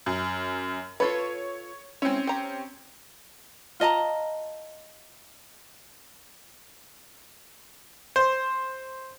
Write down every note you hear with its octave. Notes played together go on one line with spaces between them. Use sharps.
F#2
F4 A4 B4 C#5
G#3 C4 C#4 E4
G4 A#5
F4 D#5 A5 A#5
C5